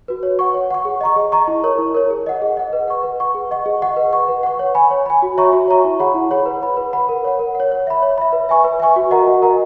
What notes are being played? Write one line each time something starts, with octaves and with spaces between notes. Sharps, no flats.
F#4 B4
C#5
F#5 C#6
C#5
F#5 C#6
G#4
D#5 A#5 C#6
G#4
D#5 A#5 C#6
E4
A#4 C#5
E4
A#4 C#5
G#4
D#5 F#5
G#4
D#5 F#5
B4
F#5 C#6
B4
F#5 C#6
G#4
D#5 F#5 C#6
G#4
D#5 F#5 C#6
B4
F#5 C#6
B4
F#5 C#6
C#5
G#5 B5
C#5
G#5 B5
F#4
C#5 E5 A#5 C#6
F#4
C#5 E5 A#5 C#6
E4
G#4 C#5 F#5 B5
E4
G#4 C#5 F#5 B5
B4
F#5 B5
B4
F#5 B5
A#4
C#5 F#5
A#4
C#5 F#5
C#5
E5 B5
C#5
E5 B5
B4
E5 G#5 C#6
B4
E5 G#5 C#6
F#4
A#4 D#5 F#5 A#5
F#4
A#4 D#5 F#5 A#5